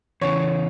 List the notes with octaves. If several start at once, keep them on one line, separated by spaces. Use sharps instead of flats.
E2 C#3 E3 C#5